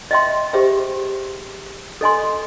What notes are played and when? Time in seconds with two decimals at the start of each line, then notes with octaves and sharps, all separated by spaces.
0.11 D#5 E5 G5 C6
0.53 G4 G#4 C5 E5 G5
2.01 A4 D#5 G#5 C6